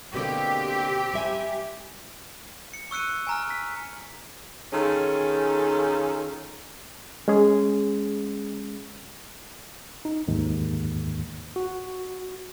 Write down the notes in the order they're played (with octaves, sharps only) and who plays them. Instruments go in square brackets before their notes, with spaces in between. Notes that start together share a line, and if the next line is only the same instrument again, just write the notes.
[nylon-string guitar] B2 D3 A#3 [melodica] C4 [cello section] G4
[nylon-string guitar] G3 E5 G#5
[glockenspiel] C#7
C#6 E6 F#6 C#7 D#7
G#5 A#5 F6
B6
[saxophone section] D#3 C#4 F4 G#4 A4
[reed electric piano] G#3 C#4 G#4
[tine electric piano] D#4
D#2 G#2 D#3
F#4